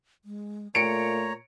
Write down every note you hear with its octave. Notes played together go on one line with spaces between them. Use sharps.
G#3
A#2 A3 C#5 A#5 C#7 D7